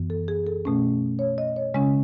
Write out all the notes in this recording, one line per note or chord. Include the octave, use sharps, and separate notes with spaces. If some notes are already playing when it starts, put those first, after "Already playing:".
Already playing: F#2 E3 B3
A4
G#4
A4
B2 A3 C#4
C#5
D#5
C#5
C#3 G#3 C#4